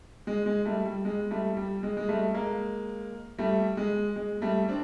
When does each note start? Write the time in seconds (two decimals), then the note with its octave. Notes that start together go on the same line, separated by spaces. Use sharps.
0.27 G#3
0.46 G#3
0.65 G3 A3
0.85 G3
1.05 G#3
1.31 G3 A3
1.57 G3
1.83 G#3
1.97 G#3
2.09 G3 A3
2.34 G#3 A#3
3.38 G3 A3
3.77 G#3
4.16 G#3
4.42 G3 A3
4.69 C4 D4